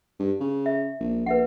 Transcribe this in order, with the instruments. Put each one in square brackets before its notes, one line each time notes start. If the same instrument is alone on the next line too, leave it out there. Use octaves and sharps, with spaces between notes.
[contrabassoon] G2
C#3
[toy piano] E5
[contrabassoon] A#1
[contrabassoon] A#1 [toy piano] B4 E5 F#5